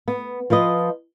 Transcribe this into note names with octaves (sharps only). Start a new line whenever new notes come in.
B3
F3 F4 B4 D#5